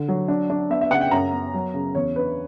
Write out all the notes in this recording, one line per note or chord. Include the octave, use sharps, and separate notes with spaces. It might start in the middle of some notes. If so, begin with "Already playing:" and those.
Already playing: D3
F#3
D4
D4
B3 E5
E5
C#3 F#5
G5
F#2 A#5
B3
F#3
C#3
E2 C#5
D4 B4